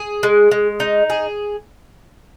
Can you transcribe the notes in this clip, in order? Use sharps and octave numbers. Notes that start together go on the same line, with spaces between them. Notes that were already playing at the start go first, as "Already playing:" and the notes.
Already playing: G#4
G#3
G#3
D#4
G#4